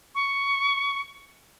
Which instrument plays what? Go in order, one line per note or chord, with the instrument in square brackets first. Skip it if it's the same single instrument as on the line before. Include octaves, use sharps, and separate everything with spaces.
[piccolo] C#6